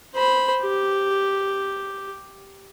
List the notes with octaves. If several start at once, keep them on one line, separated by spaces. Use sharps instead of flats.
C5 B5
G4